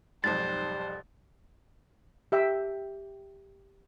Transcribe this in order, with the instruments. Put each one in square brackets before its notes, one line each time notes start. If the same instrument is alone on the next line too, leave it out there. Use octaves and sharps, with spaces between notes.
[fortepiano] B1 F2 G#2 [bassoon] G3 [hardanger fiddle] C5 [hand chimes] A6
[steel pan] G4 E5 G5